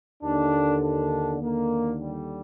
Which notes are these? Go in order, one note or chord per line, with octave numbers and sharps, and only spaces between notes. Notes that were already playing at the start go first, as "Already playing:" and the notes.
D#2 D3 D4
D4
D#2 D3 A#3
G3